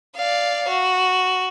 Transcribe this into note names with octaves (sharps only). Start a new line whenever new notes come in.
D5 F5
F#4